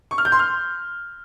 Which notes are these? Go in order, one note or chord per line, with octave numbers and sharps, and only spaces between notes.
C#6
F6
G6
C6
F6